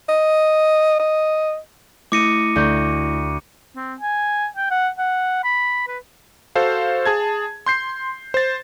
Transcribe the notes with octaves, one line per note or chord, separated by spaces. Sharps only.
D#5
D#5
A3 E4 D6 A#6 C#7 D#7
D2 G6
C4
G#5
G5
F#5
F#5
B5
B4
F#4 A4 C5 F5
G#4 A5 G#6
C6 G6 C7
C5 A6